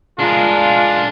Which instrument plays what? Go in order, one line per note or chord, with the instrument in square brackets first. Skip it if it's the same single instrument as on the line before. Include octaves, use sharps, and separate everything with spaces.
[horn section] G#3 F4 [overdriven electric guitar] D4 A#4